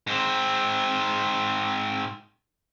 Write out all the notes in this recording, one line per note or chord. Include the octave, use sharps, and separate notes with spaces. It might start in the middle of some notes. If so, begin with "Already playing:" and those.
G#2 C4